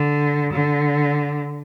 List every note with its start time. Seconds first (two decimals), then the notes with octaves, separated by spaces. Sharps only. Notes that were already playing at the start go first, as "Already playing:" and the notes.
Already playing: D3
0.53 D3